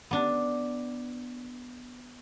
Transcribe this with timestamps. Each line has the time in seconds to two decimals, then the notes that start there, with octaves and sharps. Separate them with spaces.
0.11 B3 D4